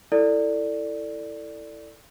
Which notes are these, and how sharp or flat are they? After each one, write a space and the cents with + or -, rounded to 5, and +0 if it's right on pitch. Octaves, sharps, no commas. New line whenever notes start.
E4 +0 A4 +15 D5 +0